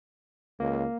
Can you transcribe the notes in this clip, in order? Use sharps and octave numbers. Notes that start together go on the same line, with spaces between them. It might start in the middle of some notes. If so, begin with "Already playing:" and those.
C#2 A#3